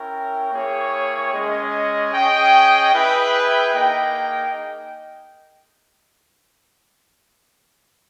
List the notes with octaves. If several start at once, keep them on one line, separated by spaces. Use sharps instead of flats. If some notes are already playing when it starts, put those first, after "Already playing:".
Already playing: C#4 E4 A#4 C#5 G5
A#3 E4 G#4 C#5 G5
G#3 C#4 G#4 D#5
C#4 G#4 D#5 G5
E4 G#4 B4 E5 G5
A#3 D#4 G#4 D#5 G5